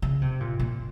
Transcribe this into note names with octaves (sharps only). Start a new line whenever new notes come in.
C#3
C3
A#2
A#2